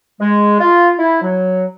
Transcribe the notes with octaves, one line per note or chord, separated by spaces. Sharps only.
G#3
F4
E4
F#3